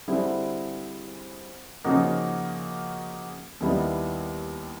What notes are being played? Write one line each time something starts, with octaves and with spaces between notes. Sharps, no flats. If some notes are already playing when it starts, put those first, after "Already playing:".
D3 G3 C4 E4 G#4
C#3 F3 A#3 D#4 F#4
D#2 D#3 G3 B3 E4